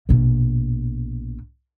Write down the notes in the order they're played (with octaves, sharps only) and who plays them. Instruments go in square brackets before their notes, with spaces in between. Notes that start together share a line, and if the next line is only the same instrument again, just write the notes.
[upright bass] A#1 B2